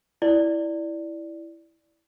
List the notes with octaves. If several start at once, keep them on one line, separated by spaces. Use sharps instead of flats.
E4 D5